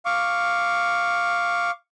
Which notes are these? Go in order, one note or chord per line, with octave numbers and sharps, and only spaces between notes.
F5 C#6 D6